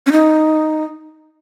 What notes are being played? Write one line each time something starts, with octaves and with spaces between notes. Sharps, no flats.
C#4
D#4